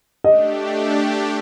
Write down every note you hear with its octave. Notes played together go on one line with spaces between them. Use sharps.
A3 D4 G4 D#5